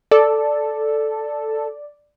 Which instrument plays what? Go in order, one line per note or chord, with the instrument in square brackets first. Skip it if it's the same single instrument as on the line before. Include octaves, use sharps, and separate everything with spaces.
[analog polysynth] A4 [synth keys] D5